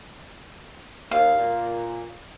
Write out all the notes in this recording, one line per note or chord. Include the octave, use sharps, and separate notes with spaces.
D#2 F5
A#2